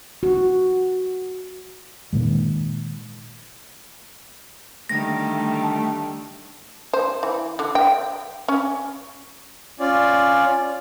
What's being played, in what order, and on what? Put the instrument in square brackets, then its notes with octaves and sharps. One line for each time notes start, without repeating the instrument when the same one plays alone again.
[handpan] F#4
[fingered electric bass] A#2 D#3 G#3
[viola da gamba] D3 D#3 G3 [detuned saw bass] A3 [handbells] A#6
[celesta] A5
[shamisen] C5
E3
D3
G5
C#4
[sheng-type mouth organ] C#4 F4 D5